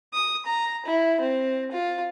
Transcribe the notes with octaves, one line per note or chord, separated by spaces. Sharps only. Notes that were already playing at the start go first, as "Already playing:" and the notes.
D#6
A#5
E4
C4
F4